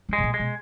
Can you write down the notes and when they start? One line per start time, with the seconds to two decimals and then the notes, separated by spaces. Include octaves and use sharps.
0.09 E3
0.13 G#3
0.18 B2
0.23 A#2
0.34 G#3
0.40 B2